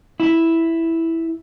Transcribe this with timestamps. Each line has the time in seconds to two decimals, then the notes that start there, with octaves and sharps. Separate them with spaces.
0.20 E4